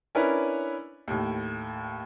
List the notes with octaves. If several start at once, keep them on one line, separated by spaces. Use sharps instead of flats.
C#4 D4 E4 A#4 B4
D#2 A2